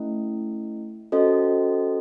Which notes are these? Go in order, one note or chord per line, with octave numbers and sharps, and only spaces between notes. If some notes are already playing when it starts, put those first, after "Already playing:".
Already playing: A3 C#4 E4
C#4 F#4 A4 C5 D#5